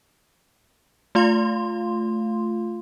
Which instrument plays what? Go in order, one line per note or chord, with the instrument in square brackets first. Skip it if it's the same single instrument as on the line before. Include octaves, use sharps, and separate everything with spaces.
[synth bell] A3 F4 F5 C6